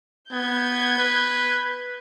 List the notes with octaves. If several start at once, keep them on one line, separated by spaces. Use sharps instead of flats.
B3 G6 G#6
B4